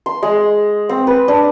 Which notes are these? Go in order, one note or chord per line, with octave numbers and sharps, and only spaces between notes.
C6
G#3
C4
B4
D4